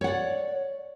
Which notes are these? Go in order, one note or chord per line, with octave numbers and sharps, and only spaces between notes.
C#5 D5 F#5